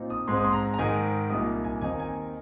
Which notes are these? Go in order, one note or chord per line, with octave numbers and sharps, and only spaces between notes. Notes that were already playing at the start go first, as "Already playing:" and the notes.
Already playing: A#2 C4 D#4
D#6
G#2 G#3 C4 C6
D#6
C6
A#5
A#5
G#2 D#3 G#3 G#5
C2 A#2 A#3 D#4 D#6
G#5
D#2 D#3 C4 D#4 G#5
G#5